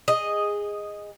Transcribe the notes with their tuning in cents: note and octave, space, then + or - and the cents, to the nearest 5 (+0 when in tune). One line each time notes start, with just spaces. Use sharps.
G#4 -15 D#5 +0